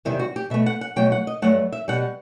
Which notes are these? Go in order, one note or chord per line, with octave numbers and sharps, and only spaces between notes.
E2 C3 D#3 G3 E4
F#4
G4
B2 A3 E5
F#5
F#5
B2 F#3 A3 G5
F#5
D#5
G2 F#3 A3 F#5
E5
B2 G3 F#5